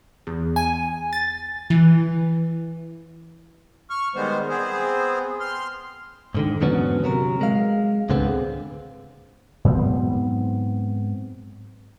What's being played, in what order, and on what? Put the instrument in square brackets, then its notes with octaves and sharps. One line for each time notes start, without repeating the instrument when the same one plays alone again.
[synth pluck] E2
G#5
A6
E3
[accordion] C#6 F6
D#3 G3 G#3 B3 C5
B3 C4 G#4 C5
C6 F6
[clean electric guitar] G#2 D3 D#3
E2 G#2 D3 F#3 B3 C#4
C3 F#3 A#4
G#3 F5
C#2 G#2 D3 B3 C4 G#4
[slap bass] G#2 F#3 B3 C4